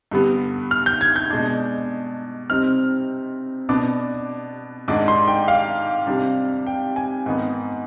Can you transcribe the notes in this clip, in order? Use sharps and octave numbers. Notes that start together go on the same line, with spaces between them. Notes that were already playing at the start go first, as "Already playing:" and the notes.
G2 D3 G3 B3
F6
G6
G#6
G6
B2 G#3 D4
C3 G3 C4 D#4 F6
B2 B3 D4 D6
G#2 D#3 G#3 D4 D6
C6
G5
F5
C3 G3 D4
G5
G#5
G#2 D#3 B3